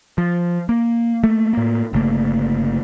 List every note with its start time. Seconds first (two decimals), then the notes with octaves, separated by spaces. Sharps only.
0.18 F3
0.69 A#3
1.23 A3 A#3
1.53 A2 A#3
1.93 G1 C#3 A3 A#3